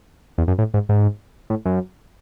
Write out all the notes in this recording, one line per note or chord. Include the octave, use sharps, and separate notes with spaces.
E2
F#2
A2
G#2
G#2
A2
F#2